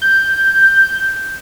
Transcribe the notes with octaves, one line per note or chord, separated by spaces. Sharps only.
G6